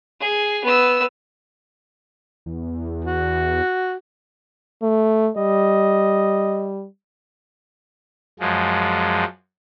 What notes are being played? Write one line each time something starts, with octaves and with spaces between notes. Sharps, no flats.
G#4
B3 E6
E2
F#4
A3
G3 D#5
F#2 F3 G#3